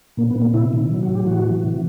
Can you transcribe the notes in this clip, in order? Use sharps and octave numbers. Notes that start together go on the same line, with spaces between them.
A#2 A#3
B3
A#2
A#3
C3 E4
D#3
F#3
F#4
A2
G4
E3 F#4
E3
C3